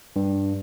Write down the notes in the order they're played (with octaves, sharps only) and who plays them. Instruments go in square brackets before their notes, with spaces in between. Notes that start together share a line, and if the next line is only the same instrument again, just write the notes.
[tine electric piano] G2